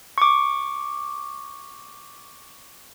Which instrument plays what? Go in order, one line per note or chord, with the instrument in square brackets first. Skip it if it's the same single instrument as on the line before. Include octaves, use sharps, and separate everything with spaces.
[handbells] C#6 D6